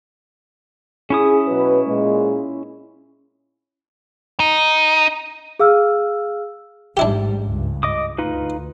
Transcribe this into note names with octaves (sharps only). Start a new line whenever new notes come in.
C#4 E4 G#4 D#6
B2 F#3 B4
A#2 G#3
D#4
G#4 F5 E6 F6
A1 G#2 G3 D4 E4 G4
C#2 G2
D#5 D6 D#6
D2 D#4 F4 B4